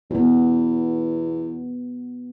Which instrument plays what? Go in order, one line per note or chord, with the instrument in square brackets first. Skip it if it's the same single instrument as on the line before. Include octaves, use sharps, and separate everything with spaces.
[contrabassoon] E2 [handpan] B3 F#4